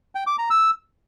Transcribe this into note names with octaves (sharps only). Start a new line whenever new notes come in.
G5
D6
A#5
E6